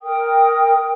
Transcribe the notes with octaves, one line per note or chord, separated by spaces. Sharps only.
A#4 G5 D#6